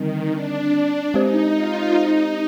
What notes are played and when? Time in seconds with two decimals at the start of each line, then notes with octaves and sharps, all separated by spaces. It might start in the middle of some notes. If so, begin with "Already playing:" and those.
Already playing: D3 D#3 G3 C4
0.31 D4
1.14 G#3 C4 D#4 G4 C5
1.55 F4
1.96 D#4